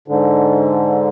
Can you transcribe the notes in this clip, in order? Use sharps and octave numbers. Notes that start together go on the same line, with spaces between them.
G#2 D3